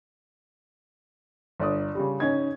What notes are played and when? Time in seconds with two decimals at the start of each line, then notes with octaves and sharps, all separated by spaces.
1.60 G1 D5 D#6
1.95 C#3 G3
2.20 C#4 D#4 G#6